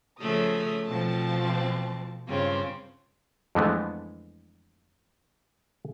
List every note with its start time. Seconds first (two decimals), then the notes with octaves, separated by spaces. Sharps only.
0.21 C#3 F3 A3 D#6
0.87 B2 F3 C4 A5
2.28 G2 C#3 C4 F4
3.55 F2 D3 E3 G#3 A3 B3